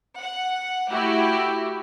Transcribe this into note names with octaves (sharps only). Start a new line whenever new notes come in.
F#5
A3 E4 F#4 G4